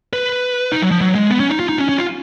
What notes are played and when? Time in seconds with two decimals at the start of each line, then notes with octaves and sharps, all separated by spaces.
0.13 B4
0.72 D#4
0.82 F#3
0.91 F3
1.01 F#3
1.15 G#3
1.30 B3
1.40 C#4
1.49 D#4
1.60 F4
1.69 D#4
1.79 C#4
1.89 C#4
1.98 F4